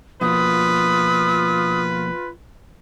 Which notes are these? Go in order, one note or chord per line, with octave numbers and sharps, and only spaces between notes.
B2 F3 A#3 F4 B4 D#6